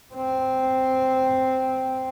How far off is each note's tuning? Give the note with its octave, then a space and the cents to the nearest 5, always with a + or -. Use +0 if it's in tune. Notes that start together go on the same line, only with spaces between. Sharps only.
C4 -5